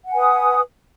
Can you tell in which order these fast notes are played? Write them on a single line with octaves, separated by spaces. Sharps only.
F#5 G#5 B4 D#6